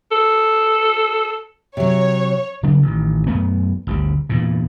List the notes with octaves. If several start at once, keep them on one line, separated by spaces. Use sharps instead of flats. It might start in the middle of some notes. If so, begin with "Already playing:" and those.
A4
C3 F#3 C#5
C#3 F#3 G3 D4
A1 D#3
F#2 A3 B3
G1 D2 G3
E2 G2 A#2